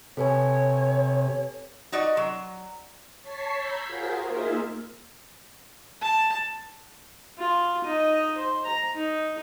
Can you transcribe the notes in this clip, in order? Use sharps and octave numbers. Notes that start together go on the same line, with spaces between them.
C3 A4 B4 C#5 G#5
D#4 F#4 D5 D#5
F#3
C#5 A5 C#6 B6 C7
A#5 B5 E6 G6 G#6 B6
F4 F#4 G#4 A#4 C5
A#3 D#4 F4 G#4 A#4 E5
A5
F4
D#4 D#5
C5
A#5
D#4